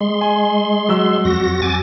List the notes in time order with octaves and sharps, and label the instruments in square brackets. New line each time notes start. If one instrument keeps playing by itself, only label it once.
[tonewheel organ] G#3 C6
[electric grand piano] G#5
F#3 E6
[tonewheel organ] F2 F#4 A#6
G#5 D6 A6